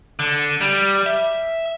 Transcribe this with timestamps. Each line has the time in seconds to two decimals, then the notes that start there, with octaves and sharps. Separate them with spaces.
0.19 D3
0.61 G3
1.06 E5